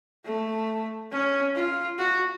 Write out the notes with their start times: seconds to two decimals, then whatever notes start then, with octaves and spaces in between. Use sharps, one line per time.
0.25 A3
1.11 C#4
1.55 F4
1.99 F#4